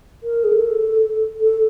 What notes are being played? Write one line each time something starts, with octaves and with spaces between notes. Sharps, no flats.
A#4
G#4
A4
A4